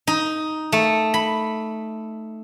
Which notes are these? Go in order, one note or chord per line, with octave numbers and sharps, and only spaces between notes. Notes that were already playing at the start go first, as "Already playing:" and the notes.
D#4
A3
B5